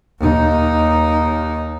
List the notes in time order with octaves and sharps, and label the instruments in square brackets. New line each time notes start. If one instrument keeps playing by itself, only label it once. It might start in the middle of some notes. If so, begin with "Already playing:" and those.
[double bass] D#2 D#4